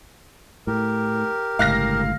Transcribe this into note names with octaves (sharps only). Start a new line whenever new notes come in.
A2 G4 A#4
G1 C#2 A2 F5 F6 A#6